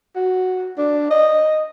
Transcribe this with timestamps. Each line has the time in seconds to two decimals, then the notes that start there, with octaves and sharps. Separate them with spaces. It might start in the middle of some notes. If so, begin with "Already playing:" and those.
0.16 F#4
0.78 D4
1.11 D#5